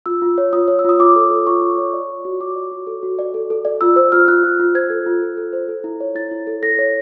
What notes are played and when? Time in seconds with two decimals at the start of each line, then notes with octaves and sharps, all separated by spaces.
0.06 F4 E6
0.22 F4
0.38 C#5
0.53 F4 D#6
0.68 C#5
0.79 E6
0.85 F4 D#6
1.00 F4 D6
1.16 A4
1.30 A4
1.47 F4 C#6
1.62 F4
1.78 C#5
1.93 D5
2.10 D5
2.25 F#4
2.40 F#4 D6
2.56 D5
2.72 F#4
2.87 A4
3.03 F#4
3.19 D5
3.34 A4
3.50 A4
3.65 D5
3.81 F4 E6
3.96 C5 E6
4.12 F4 F6
4.28 F4 F#6
4.43 F4
4.60 F4
4.75 C5 G#6
4.90 A4
5.06 F4
5.22 A4
5.37 A4
5.53 C5
5.68 A4
5.84 E4
6.00 C#5
6.15 E4 A6
6.31 E4
6.47 A4
6.63 A4 A#6
6.79 C#5